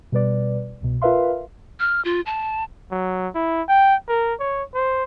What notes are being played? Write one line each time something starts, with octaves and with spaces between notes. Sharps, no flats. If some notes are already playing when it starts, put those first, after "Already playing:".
B2 G3 B4 D5
C2 B2
F4 A#4 B4 E5 F5 C6
F6
F4
A5
F#3
E4
G5
A#4
C#5
C5